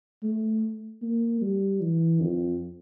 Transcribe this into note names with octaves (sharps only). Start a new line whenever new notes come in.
A3
A#3
G3
E3
F2